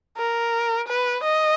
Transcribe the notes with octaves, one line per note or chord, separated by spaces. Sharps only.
A#4
B4
D#5